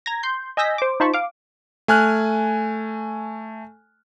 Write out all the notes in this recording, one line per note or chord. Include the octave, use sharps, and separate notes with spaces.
A#5 G#6 A#6
C6 G6
D#5 G#5 E6 G6 A#6 B6
C5 D6
D#4 F4 C5 A5 B5 C#6
F5 D6
A3 G#5 F6 F#6